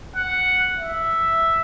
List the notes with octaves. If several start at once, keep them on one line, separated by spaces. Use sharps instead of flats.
F#5
E5